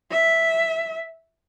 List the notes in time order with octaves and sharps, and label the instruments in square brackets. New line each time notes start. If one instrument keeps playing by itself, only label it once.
[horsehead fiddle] E5